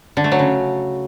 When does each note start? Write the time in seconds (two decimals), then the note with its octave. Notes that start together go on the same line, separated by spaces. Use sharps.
0.17 D3
0.24 A3
0.32 F#3
0.39 C#3